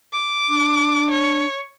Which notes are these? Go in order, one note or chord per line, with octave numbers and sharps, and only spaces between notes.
D6
D4
C#5